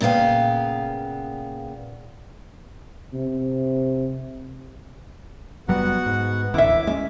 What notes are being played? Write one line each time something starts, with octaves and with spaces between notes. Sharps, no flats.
A#2 C#3 B3 F5 G5
C3
F#1 F#3 G3 B3 F#4 F#5
G#2
D#1 A1 D2 E4 E5 D6
G#3 A#3 C#4 E5